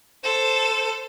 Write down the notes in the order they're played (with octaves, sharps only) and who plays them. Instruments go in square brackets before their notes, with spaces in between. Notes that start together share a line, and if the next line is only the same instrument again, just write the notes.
[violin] A4 C5